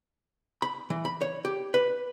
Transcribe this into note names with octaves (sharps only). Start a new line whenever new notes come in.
B5
E3
B5
C#5
G4
B4